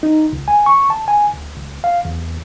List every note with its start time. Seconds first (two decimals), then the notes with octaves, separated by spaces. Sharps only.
0.03 D#4
0.33 C#2
0.48 G#5
0.66 C#6
0.90 A5
1.08 G#5
1.33 D2
1.57 C#2
1.84 F5
2.05 E2